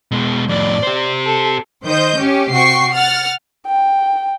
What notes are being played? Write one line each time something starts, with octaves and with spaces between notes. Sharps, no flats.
B2 G#3
F2 A2 D5
G4 C5
A4
D#3 C5 D#5 G6
C#4 G4
C3 F#4 G5 C#6 C7
F#5 F6 A6
G5